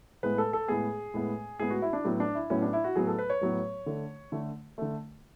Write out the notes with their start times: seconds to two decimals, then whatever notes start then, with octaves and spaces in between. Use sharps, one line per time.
0.23 A2 G#3 B3 B4
0.38 A4
0.53 A4
0.68 A2 G#3 B3 G#4
1.14 A2 G#3 B3
1.59 A2 G#3 B3 G#4
1.70 F#4
1.82 E4
1.93 D4
2.05 A2 F#3 B3
2.20 D4
2.35 E4
2.50 A2 F#3 B3 C#4
2.62 D4
2.73 E4
2.84 F#4
2.95 A2 F#3 B3 G#4
3.07 A4
3.18 B4
3.30 C#5
3.41 A2 F#3 B3
3.86 D3 A3
4.32 D3 A3
4.78 D3 A3